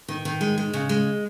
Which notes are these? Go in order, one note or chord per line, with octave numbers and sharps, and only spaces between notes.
D#3
D#3
G#3
G#3
C#3
G#3